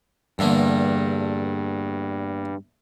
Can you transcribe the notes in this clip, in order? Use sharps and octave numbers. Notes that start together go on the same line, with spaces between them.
E2 G2 D3 A#3